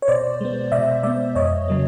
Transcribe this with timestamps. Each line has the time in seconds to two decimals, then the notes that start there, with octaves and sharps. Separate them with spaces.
0.02 C#5
0.08 B2 C5 D5
0.41 G#3 B3
0.72 B2 D5 E5
1.03 G#3 B3 D5 E5
1.35 F2 C#5 D#5
1.68 C#3 F#3 A#3